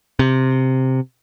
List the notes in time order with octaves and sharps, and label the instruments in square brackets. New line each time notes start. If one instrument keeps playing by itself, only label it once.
[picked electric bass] C3